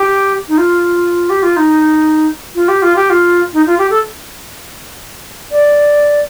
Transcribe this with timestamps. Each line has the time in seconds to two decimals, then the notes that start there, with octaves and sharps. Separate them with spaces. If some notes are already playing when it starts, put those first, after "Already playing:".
Already playing: G4
0.48 D#4
0.58 F4
1.30 G4
1.43 F4
1.57 D#4
2.55 F4
2.68 G4
2.82 F4
2.96 G4
3.10 F4
3.53 D#4
3.66 F4
3.78 G4
3.90 A4
5.51 D5